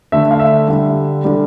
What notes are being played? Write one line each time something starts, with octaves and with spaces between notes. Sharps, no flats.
D3 A3 E5
F5
E5
D3 G3
D3 G3